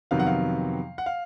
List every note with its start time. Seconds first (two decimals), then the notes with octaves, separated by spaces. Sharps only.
0.11 F2 C3 D#3 F#3 B3 F5
0.20 F#5
0.27 F5
0.98 F#5
1.06 F5